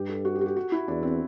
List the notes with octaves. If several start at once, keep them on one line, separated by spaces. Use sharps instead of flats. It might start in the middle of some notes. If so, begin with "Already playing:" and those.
Already playing: G2 G4
A4
F#4
G4
F#4
G4
F#4
E4
E2 D4
C4